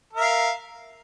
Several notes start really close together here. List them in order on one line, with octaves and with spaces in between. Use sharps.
A#4 E5 F5